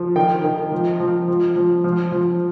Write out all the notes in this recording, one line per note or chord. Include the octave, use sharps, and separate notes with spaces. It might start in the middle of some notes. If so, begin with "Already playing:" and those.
Already playing: F3
D#3 G5
D#3
F3
F3
F3
F3
F3
F3